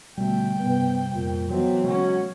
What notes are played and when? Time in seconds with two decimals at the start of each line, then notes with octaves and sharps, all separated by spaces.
0.18 B2 D3 G3 A3 G5
0.60 G2 C3 B3
1.13 F2 A#2
1.50 E3 F#3 B3 C4
1.84 C#3 G#3 C#4 F#4